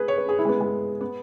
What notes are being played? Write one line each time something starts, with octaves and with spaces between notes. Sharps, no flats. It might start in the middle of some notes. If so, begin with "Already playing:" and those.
Already playing: G#4 B4
C#5
B4
G#4
E4
G#3
B3
G#3
B3